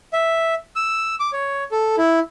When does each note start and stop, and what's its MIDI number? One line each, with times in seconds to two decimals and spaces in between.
0.13 0.54 76
0.76 1.15 88
1.20 1.31 86
1.33 1.64 73
1.72 1.96 69
1.98 2.20 64